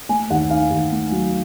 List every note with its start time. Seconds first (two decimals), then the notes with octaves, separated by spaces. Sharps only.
0.09 A3 G#5
0.30 D#2 F#5
0.50 D#3 F5
0.71 D#2
0.92 A3
1.12 F#3